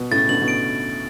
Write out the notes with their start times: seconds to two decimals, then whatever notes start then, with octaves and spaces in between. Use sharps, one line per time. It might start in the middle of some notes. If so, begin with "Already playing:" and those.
Already playing: B2
0.11 A2 C#3 A6
0.29 B2 D3 F#7
0.41 B2
0.48 D7